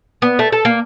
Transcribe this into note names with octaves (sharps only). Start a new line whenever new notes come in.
B3
A3
A4
A#3